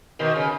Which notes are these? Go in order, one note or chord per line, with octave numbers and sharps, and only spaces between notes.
B2 D#3
C#3